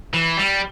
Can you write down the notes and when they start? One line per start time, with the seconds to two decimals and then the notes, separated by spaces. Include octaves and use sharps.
0.14 E3
0.37 G3